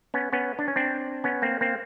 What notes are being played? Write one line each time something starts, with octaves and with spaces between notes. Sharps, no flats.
B3 C#4
B3 C#4
D4
C#4
C4 D4
B3 C#4
A#3 C4
A#3 C4